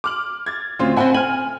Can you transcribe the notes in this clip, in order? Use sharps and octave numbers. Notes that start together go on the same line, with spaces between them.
D6 F6 F#7
G#6 A6
D2 C#3 C4 F4 C6
C4 C5 E5 F#5 G#5 B5
G#5 F6 F#7